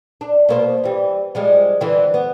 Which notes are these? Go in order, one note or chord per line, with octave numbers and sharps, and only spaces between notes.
D4
B2 A#3 C5
E3 G3
F3 G3 G#3
D3 E3 C4
B3